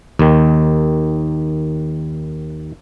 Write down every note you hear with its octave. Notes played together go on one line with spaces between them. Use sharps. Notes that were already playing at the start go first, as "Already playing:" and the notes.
D#2 D#3